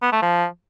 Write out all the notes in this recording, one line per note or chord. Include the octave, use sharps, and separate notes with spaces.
B3
A3
F3